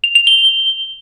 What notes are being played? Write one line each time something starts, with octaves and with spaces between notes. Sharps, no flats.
F7
F7
G7